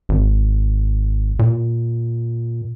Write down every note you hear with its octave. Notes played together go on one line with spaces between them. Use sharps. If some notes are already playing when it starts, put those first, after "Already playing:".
G#1
A#2